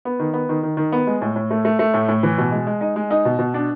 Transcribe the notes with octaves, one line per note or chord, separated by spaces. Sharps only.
B3
D#3
B3
D#3
D#3
D#3
B3
G#3
A2
A2
A3
A3
A3
A2
A2
E3
B2
G#3
G#3
D#4
G#3
D#4
B2
B2
D4